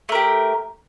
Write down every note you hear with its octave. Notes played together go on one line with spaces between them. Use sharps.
A3 G4 A#4